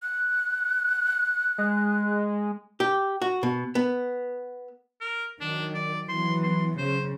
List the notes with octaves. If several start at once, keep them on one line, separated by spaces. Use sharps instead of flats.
F#6
G#3
G4
F#4
B2
B3
A#4
D#3 F#3 D4
D5
E3 F#3 B3 C6
C6
C#3 C5